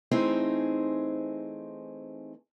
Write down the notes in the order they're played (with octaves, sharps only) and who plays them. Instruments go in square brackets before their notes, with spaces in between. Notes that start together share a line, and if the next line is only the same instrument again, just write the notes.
[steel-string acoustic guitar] E3 A3 C4 D#4 G#4 C5